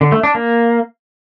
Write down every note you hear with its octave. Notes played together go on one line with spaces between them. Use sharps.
D3
A3
D4
A#3